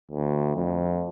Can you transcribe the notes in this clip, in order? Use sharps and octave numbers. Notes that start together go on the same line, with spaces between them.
D2
F2